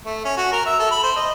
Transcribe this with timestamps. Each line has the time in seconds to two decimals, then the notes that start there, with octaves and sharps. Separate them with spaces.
0.06 A3
0.25 C#4
0.37 F#4
0.52 A#4
0.66 E5
0.79 A4
0.91 B5
1.03 C5
1.16 D#5